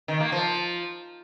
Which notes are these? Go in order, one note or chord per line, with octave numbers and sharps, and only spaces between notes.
D#3
A#3
F3